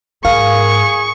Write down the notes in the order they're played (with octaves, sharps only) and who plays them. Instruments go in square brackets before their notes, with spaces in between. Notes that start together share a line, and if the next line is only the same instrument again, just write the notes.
[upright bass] G#2 [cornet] G#4 [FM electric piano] A#4 F5 [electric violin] C#6